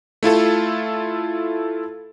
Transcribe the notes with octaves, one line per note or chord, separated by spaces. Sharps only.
A3 E4 F4 A4